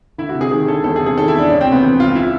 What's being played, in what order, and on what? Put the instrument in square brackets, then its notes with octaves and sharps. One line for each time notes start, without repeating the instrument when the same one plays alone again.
[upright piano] D2 E4
F#4
C3
G#4
D#3 G#4
D2 A4
E2 A4
G#4
C3
G#4
D#3 A4
E4
E2 D4
C#2 C#4
C4
C3
B3
E3 C4
C#2 F4
E4